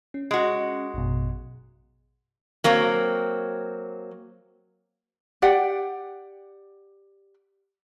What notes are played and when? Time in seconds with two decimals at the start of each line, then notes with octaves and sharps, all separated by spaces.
0.14 C#4
0.31 G#3 F#4
0.94 A1 F#2 B2
2.64 F#3 A#3 C4
5.42 G4 D5 F#5 G5